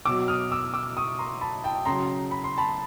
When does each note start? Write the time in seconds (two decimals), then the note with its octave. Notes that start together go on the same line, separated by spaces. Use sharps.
0.05 B2 F#3 D6 E6
0.28 D#6 F6
0.52 D6 E6
0.74 D6 E6
0.97 C#6 D#6
1.19 A#5 C6
1.41 A5 B5
1.64 G5 A5
1.86 C#3 F#3 A#5 C6
2.31 B5
2.44 C6
2.58 A5 B5